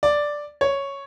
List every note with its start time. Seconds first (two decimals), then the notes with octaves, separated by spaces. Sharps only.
0.03 D5
0.61 C#5